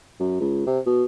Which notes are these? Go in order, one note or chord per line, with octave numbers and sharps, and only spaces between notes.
F#2
C#2
C3
B2